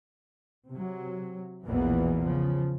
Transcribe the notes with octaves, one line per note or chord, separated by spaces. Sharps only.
C3 F#3
A#1 E2 B2 E3 A#3 B3
C#3 F3